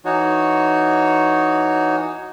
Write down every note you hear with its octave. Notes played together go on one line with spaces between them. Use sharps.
E3 D#4 F#4 C#5